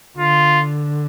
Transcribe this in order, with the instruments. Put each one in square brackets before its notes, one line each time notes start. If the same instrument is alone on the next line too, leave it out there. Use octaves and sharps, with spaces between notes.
[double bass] D3 [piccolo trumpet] F4